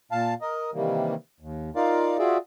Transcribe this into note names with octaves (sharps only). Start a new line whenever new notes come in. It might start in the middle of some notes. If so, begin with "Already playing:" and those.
A#2 F5 A5
A#4 D#5
C3 D#3 E3 G3 A#3
D#2
D#4 F4 A#4 D5 F5
F4 F#4 G#4 D5 E5